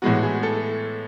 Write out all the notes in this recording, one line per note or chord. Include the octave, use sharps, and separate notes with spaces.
A2 E3 G#3 B3 F#4
G#4
A4